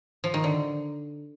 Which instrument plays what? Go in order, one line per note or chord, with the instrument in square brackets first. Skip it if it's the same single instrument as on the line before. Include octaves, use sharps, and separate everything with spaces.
[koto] F3
D#3
D3